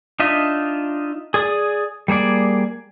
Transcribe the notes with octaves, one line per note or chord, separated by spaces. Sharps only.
D4 D#4 F4 D#5 E5
G#4 D5 D#6
G3 A#3 G#4 D5